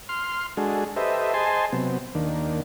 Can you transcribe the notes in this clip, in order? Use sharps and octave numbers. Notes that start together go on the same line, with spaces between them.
C6 F6
G#3 D4 F#4 G#4 A4
G4 A4 B4 C5 D#5 E5
G#4 C5 D#5 G#5 A5 C6
C3 F#3 B3 C4
D#2 D#3 A#3 D4